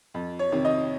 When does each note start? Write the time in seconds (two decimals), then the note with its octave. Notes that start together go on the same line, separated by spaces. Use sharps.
0.14 F2
0.39 C#5
0.52 C3 D#3
0.65 D#5